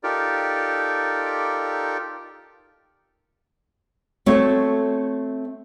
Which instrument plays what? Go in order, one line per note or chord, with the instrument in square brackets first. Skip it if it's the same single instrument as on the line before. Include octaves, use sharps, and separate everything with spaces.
[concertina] D#4 F4 G4 A4 A#4 D5
[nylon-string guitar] A3 C4 F#4 A4 C#5